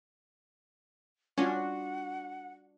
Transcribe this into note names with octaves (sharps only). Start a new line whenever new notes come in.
G3 C#4 D4 F4 F#4 F#5